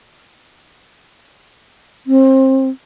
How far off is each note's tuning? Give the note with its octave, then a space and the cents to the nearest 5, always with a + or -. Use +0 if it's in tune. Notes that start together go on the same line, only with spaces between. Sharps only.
C4 +25